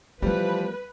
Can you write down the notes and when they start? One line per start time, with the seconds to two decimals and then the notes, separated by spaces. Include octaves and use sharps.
0.22 E3 F3 G3 A3 B3 B4